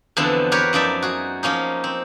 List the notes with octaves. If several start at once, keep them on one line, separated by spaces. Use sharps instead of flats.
E2 D3 F3 B3 C4 A5
F#4 G4 A#4 B4 C#5
F#2 F3 D#4 D5 E5
F#4 G#4
F3 A#3 C#4 D#4
C4